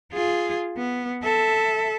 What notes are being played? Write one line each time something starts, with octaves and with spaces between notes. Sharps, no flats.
F4 G#4
B3
A4 E5